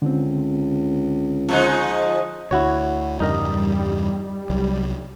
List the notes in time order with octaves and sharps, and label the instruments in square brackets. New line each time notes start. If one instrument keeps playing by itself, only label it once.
[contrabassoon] C#2 [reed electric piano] D3 C4
[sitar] F3 G#3 D#4
[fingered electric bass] D2 D3 [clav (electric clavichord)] E4 F#4 C#5
[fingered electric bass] E2 G2 C#3 [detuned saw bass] G3 [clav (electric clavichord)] D#4 A#4 D#5
[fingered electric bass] C2 F#3